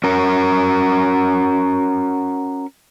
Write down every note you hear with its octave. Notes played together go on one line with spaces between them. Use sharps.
C#4 F#4 A#4